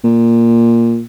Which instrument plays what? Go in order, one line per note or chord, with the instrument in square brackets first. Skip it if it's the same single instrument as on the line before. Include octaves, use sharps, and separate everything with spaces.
[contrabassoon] A#2